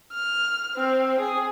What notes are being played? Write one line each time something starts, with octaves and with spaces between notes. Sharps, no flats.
F6
C4
G#4